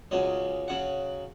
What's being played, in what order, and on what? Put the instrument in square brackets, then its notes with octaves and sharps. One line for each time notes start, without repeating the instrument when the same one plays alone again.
[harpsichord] C#2 C#3 F#3 D#5
C#3 F#3 F#5